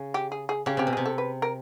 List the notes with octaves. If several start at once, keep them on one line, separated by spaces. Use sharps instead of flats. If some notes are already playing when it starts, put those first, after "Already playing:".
Already playing: C#3
G4
G#4
G#4
C#3 G4
C3 G4
B2
C3 G#4
A4
B4
A#4